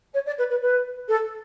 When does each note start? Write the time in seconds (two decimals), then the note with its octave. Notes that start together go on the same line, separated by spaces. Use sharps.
0.14 C#5
0.26 D5
0.38 B4
0.50 B4
0.61 B4
1.08 A4